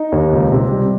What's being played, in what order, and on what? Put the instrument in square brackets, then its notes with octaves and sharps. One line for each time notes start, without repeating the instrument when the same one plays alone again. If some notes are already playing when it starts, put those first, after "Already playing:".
Already playing: [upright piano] D#4
D#2
C#2
C3
G3